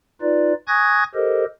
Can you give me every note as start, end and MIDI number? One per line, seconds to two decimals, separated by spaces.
0.21 0.53 63
0.21 0.53 65
0.21 0.53 71
0.21 0.53 74
0.68 1.04 80
0.68 1.04 85
0.68 1.04 87
0.68 1.04 90
0.68 1.04 92
0.68 1.04 94
1.15 1.45 67
1.15 1.45 69
1.15 1.45 70
1.15 1.45 72
1.15 1.45 75